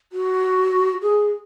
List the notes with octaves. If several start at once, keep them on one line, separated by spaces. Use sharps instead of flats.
F#4
G#4